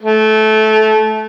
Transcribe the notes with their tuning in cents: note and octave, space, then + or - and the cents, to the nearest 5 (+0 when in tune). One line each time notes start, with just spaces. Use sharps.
A3 -20